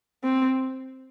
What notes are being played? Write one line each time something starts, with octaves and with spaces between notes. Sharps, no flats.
C4